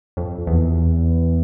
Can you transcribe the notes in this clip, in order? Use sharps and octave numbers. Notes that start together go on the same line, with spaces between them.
F2
E2